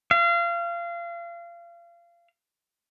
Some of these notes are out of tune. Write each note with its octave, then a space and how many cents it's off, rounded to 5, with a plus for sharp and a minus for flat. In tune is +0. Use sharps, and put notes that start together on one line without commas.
F5 -30